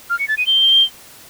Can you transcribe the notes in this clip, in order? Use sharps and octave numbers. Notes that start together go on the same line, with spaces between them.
F6
C#7
A6
D#7
G7